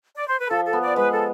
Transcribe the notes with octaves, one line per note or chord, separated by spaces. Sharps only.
D5
C5
B4
F3 A4
A4
B3
D5
G#3 B4
A4